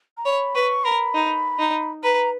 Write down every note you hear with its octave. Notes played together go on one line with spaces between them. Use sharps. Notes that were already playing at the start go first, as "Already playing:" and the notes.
A#5
C#5 B5
B4 C#6
A#4 B5
D#4
D#4
B4 A#5